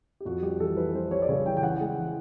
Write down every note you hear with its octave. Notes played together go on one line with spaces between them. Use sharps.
G4
F2 F#4
G3 G4
E3 A4
E3 B4
G3 C5
G3 C#5
D5
C#3 C#5
E3 G5
G5
E3 F#5
G#3
E3